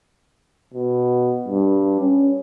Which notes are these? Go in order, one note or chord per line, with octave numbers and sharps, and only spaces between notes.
B2
G2
C#4